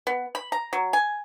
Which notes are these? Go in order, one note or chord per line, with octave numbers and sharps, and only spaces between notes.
B3
B5
A#5
F#3
G#5